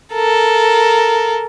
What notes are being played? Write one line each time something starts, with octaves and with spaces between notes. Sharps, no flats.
A4 A#4